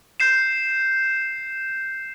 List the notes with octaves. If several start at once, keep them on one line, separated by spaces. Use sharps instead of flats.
G6 C7 E7